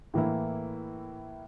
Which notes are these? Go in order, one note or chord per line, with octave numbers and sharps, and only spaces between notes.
A2 E3 A#3 E4